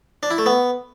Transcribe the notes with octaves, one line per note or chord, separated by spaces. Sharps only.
D4
E4
A3
B3